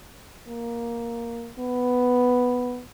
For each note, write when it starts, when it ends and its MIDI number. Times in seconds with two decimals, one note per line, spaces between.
0.47 1.50 58
1.59 2.83 59